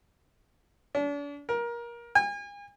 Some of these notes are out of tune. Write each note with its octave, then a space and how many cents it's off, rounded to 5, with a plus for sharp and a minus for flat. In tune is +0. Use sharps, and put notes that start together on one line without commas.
D4 -40
A#4 +20
G#5 -40